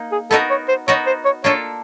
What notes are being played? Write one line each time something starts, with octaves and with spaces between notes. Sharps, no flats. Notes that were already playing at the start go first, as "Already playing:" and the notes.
Already playing: A#3 D#4
G#4
B3 D#4 F#4 A4 A#4
C#5
C5
B3 D#4 F#4 A#4 C#5
C5
C#5
A#3 D4 F4 A4 C#5